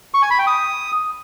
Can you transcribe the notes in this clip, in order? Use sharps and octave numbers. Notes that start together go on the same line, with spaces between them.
C#6
G#5
B5
G5
D#6